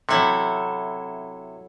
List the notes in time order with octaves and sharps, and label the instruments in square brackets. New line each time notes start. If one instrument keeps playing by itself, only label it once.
[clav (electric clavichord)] C3 [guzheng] F#3 E4 A4